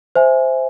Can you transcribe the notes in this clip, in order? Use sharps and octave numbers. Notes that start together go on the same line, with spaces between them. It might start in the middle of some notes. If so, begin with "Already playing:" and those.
C5 E5 G#5